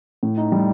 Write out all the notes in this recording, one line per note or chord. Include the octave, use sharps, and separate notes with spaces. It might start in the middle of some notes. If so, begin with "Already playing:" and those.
A2
D#4
G3